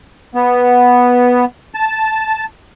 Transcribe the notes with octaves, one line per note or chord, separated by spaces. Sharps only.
B3
A5